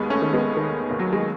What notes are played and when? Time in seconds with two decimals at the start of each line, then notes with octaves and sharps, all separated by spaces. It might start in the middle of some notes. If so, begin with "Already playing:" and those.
Already playing: D#2 G#3 B3
0.10 A3 C#4
0.22 D#3
0.33 G#3 B3
0.57 D#3
0.91 D#2
0.99 F#3
1.13 G#3